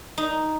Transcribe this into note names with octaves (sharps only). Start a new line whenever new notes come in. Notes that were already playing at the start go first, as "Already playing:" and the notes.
D#4